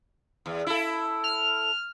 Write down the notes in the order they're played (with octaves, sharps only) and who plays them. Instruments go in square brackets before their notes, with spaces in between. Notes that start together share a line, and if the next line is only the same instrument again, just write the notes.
[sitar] E2
E4 A4
[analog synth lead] F6